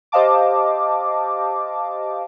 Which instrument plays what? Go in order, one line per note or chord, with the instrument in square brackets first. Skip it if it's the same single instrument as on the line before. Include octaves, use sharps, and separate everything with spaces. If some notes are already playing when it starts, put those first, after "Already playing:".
[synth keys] G4 C5 D#5 F5 A5 D6